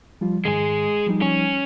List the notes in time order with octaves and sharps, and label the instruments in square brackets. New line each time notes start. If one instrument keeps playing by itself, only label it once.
[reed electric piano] F3 G3 F4
[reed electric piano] G#2 D#3 [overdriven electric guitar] G#3 G#4
[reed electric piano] F3 G3 D#4
[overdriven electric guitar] C#4